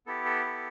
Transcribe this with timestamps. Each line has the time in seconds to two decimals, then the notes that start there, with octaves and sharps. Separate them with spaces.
0.06 B3 E4 G4 A4
0.25 A4
0.46 A4